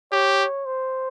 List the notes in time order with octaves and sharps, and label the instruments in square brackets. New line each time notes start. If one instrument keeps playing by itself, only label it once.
[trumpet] G4 [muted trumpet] C#5
[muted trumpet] C5